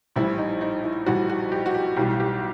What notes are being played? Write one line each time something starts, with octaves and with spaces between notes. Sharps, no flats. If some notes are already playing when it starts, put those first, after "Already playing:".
A#1 A2 E3 G3 E4
D#4
D#4
E4
A#1 A2 E3 G3 F#4
F#4
G4
F#4
G4
B1 A2 E3 G3 G4
G4